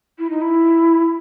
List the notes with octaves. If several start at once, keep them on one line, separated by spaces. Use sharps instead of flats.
E4
D#4
E4